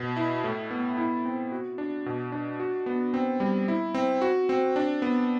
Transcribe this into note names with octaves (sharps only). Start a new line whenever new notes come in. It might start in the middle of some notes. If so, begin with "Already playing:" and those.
Already playing: B2
E4
A2
B3
E4
C4
F#4
D4
B2
D4
F#4
B3
C4
G3
E4
C4
F#4
C4
D4
B3